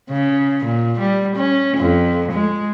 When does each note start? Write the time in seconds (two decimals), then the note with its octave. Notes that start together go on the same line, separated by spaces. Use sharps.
0.10 C#3
0.65 A#2
1.00 G3
1.36 C#4
1.78 F2
2.32 G#3